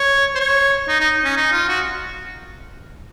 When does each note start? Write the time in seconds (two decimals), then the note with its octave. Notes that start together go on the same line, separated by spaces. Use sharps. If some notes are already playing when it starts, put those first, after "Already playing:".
Already playing: C#5
0.35 C5
0.40 C#5
0.88 D#4
1.00 D#4
1.24 C#4
1.37 D#4
1.52 F4
1.68 F#4